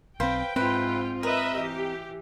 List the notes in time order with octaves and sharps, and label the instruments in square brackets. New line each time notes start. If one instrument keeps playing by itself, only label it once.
[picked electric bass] B1 C4 [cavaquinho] B4 C5 F5 [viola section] G5
[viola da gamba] G#2 F4 [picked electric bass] C4 [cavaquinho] E4 B4 C5
[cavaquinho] A#4 [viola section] B4 D#5 E5
[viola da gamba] E3 [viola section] G4